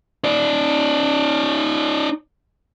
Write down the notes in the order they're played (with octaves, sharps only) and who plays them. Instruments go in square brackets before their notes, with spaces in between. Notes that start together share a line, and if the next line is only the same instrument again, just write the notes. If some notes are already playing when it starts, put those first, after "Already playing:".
[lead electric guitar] D#4 D5